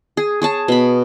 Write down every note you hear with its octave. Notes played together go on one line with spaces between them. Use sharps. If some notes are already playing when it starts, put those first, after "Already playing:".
G#4
G#4 C#5 A5
B2 B5